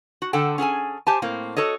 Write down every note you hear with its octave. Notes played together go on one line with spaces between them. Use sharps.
F#4
D3 A4 F#5 G5
C#4 G#4 A4 G#5
G4 C5 G#5 A5
A2 A#3 C4
F#4 A4 C#5 D#5